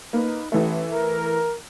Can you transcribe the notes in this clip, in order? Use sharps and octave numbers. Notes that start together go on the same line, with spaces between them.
A#3 D#4 B4
A1 E3 A3
A#4